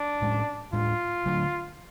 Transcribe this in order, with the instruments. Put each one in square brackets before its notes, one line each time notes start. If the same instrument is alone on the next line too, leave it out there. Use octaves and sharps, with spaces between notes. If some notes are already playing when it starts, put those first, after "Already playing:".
Already playing: [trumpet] D4
[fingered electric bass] A2 G#3 C#4
[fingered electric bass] A2 G#3 D4 [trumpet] F4
[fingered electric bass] D3 F#3 A3 D4